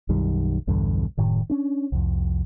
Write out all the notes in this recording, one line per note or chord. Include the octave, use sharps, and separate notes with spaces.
B1 F#2 D#3 G3
B1 E2 G2 D3
F#1 A2 D#3
C#4 D4
C2 F2